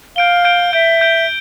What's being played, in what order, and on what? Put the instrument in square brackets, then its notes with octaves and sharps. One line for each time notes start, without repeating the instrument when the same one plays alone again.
[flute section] F5 [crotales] G6 D7 G7
[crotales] G6 D7 G7
[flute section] E5 [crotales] G6 D7 G7
[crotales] G6 D7 G7